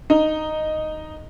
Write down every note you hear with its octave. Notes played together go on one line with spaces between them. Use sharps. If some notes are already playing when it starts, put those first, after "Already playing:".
D#4